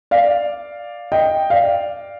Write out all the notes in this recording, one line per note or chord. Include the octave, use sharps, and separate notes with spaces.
D5 F5
D#5 G5
D5 F5